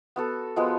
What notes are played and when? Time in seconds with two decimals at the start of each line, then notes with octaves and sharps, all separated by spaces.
0.16 B3 F#4 A4
0.56 F3 G#3 B3 F#4